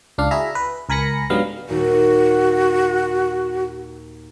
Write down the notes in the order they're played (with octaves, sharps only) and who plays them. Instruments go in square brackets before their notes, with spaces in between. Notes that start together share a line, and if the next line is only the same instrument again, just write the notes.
[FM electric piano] C#2 D4 F5
E4 F#4 G#4 E5 A#5
B4
C#2 A#4 G#5 B5 A#6 C#7
G#2 D3 F#3 G3 B3 F5
[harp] D#2 A#2 [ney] F#4